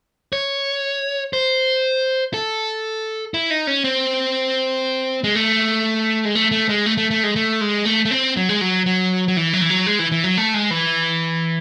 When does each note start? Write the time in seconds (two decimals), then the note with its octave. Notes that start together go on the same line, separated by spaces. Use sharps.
0.33 C#5
1.33 C5
2.34 A4
3.34 E4
3.50 D#4
3.67 C#4
3.84 C4
5.24 G#3
5.35 A3
6.25 G#3
6.35 A3
6.51 A3
6.69 G#3
6.86 A3
6.97 A3
7.11 A3
7.24 G#3
7.36 A3
7.61 G#3
7.85 A3
8.05 A3
8.11 C4
8.37 F#3
8.49 G#3
8.61 F#3
8.86 F#3
9.28 F#3
9.37 E3
9.53 F#3
9.61 E3
9.70 F#3
9.86 G#3
9.99 E3
10.12 E3
10.24 F#3
10.37 A3
10.54 G#3
10.71 E3